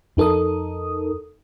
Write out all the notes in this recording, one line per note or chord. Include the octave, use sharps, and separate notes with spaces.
F2 D#4 A4 A#4 D#6